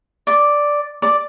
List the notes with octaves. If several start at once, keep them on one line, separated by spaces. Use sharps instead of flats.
D5
D5